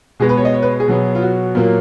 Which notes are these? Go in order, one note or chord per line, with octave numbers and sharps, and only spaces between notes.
B2 G#3 B3 G#4
B4
C#5
D#5
C#5
B4
G#4
B2 F#3 B3
F4
F#4
A#2 F#3 A#3